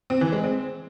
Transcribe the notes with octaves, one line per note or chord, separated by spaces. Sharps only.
C4
E3
G#3
C4